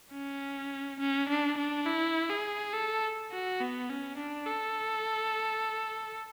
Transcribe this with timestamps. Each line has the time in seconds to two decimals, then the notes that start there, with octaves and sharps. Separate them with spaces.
0.12 C#4
1.00 C#4
1.29 D4
1.58 D4
1.86 E4
2.29 G#4
2.73 A4
3.31 F#4
3.60 B3
3.89 C#4
4.17 D4
4.46 A4